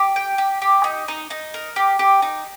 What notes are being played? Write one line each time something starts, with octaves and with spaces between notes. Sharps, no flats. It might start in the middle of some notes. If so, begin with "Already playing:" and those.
Already playing: G4
G5
G4
G4
D#4
D#4
D#4
A#4
G4
G4
D#4